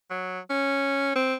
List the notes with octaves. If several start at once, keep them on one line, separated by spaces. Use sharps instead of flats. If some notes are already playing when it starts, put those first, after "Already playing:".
F#3
C#4
C4